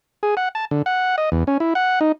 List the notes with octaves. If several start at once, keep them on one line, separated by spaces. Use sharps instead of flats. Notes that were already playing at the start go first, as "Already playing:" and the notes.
G#4
F#5
A5
D3
F#5
D#5
E2
C#4
E4
F#5
D#4